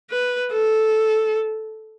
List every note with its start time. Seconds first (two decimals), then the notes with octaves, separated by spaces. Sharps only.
0.11 B4
0.52 A4